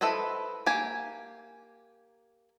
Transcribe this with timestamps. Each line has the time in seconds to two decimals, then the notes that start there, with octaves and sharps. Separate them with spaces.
0.01 E4 A4 B4 C5 D#5
0.66 A#3 G4 G#5